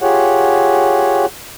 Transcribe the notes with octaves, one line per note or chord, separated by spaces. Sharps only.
F4 G4 G#4 C#5 F#5